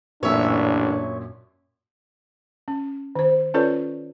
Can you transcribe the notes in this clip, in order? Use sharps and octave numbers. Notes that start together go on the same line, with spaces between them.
A1 F#2 A#2 D4 C#5 E5
C#4
D#3 C5
C#4 F4 A4 B4 C#5 D5